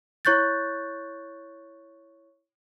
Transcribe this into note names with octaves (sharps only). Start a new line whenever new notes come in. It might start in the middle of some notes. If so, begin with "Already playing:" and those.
E4 C#5 C#6 F#6 G6 A6